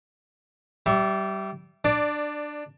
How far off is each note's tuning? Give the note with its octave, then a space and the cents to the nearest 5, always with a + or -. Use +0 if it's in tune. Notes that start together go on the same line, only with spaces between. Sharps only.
G3 -20 E5 +0 C#6 +40
D4 +15 D5 +0